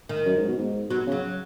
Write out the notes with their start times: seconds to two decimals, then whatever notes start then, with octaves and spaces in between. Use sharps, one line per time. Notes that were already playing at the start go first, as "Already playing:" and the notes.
0.09 D#3
0.26 F#2
0.37 G#2
0.48 B2
0.58 G#2
0.90 B2 F#3
1.07 C#3 F#3